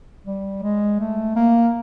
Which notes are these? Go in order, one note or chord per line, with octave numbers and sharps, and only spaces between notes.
G3
G#3
A3
A#3